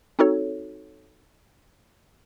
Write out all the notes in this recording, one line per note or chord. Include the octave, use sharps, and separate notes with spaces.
C4 D#4 F#4 A4 C#5